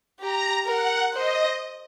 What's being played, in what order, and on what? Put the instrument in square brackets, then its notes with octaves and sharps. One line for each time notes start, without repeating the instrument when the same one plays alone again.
[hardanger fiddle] G4 [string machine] A#5
[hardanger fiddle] A#4 [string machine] F#5
[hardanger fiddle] C5 [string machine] D#5